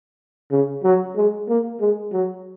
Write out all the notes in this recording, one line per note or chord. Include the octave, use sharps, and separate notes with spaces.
C#3
F#3
G#3
A#3
G#3
F#3